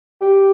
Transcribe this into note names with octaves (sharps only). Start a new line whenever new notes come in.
G4